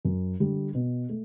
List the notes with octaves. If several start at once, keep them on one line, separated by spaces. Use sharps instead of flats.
F#2
D3 G3
B2
A3